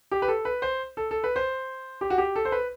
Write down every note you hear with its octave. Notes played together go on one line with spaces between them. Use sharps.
G4
B4
A4
B4
C5
A4
A4
B4
C5
G4
F#4
G4
A4
C5
B4